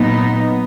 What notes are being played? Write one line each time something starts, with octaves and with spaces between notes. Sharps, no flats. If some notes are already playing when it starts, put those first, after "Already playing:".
Already playing: A#2 F#3 B3 D#4
B3